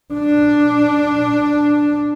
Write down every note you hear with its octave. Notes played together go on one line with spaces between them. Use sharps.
D4